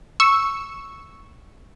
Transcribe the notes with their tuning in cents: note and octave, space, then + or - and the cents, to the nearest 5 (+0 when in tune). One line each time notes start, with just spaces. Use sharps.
C#6 +0 E6 +0